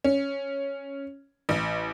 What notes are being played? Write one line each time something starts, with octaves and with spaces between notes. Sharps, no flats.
C#4
A1